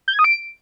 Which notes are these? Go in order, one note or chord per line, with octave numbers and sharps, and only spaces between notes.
G6
G#6
D#6
D7